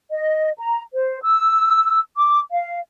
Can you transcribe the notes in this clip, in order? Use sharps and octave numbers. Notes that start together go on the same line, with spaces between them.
D#5
A#5
C5
E6
D6
F5